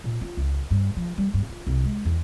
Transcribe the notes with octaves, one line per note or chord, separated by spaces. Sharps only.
A#2
F4
C#2
G2
F3
G3
G2
F4
C2
G#3
E2